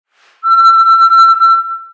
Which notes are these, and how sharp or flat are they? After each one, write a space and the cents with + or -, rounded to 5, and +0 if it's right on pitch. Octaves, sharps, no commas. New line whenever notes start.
E6 +30